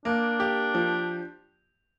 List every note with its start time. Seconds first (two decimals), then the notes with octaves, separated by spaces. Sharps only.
0.05 A#3 D4
0.40 G4
0.75 F3